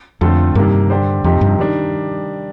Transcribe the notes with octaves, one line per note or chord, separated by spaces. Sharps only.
F2 D3 A3 C4 F4 A4
G2 C3 D#3 A#3
D3 G3 D4 G4 C5
F2 C3 F3 C4 D#4 G4
G2
D#3 G3 D4